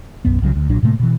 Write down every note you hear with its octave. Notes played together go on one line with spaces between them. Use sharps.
D1 B1 F#2 B3
C2 C#3 F#3
D2
B1 A#2 F#3 D4
A2 C3 A3 A#3
B2 E3